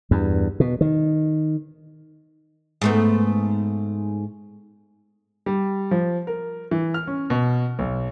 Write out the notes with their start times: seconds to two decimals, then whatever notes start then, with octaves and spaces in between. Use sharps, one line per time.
0.11 E2 G2
0.60 B2
0.81 D#3
2.82 G#2 A3 B3
5.46 G3
5.91 F3
6.27 A#4
6.71 E3
6.94 F6
7.07 C#4
7.30 B2
7.79 B1